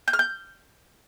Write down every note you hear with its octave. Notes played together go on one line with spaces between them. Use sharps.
G6
F6
G6